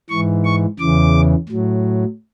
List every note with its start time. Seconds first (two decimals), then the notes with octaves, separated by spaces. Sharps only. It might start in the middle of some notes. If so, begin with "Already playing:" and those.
0.10 G#2 E3 C#6
0.45 C#6
0.79 E2 C#3 E3 D6
1.49 A2 F#3